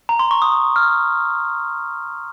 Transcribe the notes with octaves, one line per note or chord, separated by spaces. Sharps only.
A#5
C6
C#6
D#6
F6